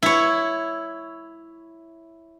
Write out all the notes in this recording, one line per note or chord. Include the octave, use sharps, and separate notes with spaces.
E4 C#5